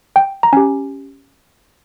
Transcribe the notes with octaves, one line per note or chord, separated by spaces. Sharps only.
G5
A#5
C#4 G4 G#5